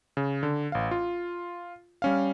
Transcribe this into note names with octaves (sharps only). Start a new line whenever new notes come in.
C#3
D3
A1 F5
F4
G3 C#4 F5